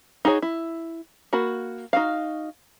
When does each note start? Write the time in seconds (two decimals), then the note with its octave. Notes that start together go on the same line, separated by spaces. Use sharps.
0.25 D#4 F#4 G#4 C#5
0.42 E4
1.33 A#3 F#4 B5
1.93 D#4 F#4 F5